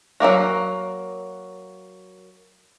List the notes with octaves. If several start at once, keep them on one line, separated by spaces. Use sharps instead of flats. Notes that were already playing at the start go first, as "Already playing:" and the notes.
F#3 A3 A#3 F#4